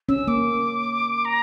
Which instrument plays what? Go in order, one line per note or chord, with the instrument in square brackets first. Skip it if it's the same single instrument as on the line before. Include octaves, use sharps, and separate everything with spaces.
[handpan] C#4 [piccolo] E6
[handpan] A#3 [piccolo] D6
[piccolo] A#5